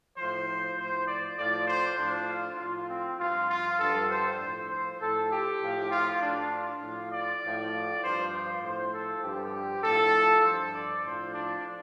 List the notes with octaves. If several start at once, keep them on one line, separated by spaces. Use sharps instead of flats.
A2 F3 C5
A2 F3 C5
D5
A2 F3 D5
C5
A2 F3 D4
F4
A2 F3 F4
C4
G2 F3 F4
F4
G2 D3 F3 A4
C5
A2 F3
C5
A2 F3 A4
G4
A2 F3
F4
A2 F3 D4
F4
A2 F3
D5
A2 F3
G2 F3 C5
C5
A2 F3 C5
A4
G2 D3 F3 G4
A2 F3 A4
G2 D3 F3 C5
D5
A2 F3 C5
D4